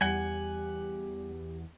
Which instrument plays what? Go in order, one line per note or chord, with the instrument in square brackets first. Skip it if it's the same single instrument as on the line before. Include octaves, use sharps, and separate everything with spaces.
[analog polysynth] E2 [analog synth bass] G3 [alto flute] G4 [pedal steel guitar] F#5 G#5